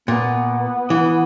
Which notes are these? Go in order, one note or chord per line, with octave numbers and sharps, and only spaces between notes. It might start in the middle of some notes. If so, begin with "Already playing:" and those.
A#2 B3
E3